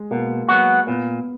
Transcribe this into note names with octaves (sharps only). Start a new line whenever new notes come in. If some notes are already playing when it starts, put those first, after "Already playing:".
Already playing: G#3
B2 A#3
F#3 B3 F#4
A#2 B3